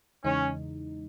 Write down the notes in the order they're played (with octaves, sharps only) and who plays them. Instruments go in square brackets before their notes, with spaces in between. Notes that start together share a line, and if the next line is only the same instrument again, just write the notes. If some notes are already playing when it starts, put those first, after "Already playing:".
[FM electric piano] E2 C#3 E3 G#3 D#4 [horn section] C#4